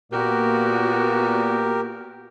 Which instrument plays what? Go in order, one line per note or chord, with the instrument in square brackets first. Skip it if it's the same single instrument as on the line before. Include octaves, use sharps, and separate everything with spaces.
[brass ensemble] A#2 [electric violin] B3 F#4 [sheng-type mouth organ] G4 A#4